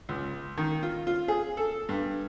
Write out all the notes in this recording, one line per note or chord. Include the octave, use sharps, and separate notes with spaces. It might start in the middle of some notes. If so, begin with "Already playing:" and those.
C#2
D#3
F4
F4
G#4
A4
G2